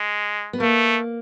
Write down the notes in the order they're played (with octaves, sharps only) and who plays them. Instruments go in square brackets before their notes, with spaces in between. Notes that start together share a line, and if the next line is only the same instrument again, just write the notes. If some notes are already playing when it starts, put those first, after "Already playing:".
Already playing: [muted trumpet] G#3
[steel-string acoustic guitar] B3
[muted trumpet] A3 [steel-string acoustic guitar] A#3